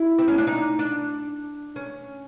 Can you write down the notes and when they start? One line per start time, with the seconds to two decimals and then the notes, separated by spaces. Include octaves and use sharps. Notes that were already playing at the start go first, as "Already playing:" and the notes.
Already playing: E4
0.18 C4
0.28 C#4
0.38 D4
0.47 D#4
0.79 D4
1.76 C#4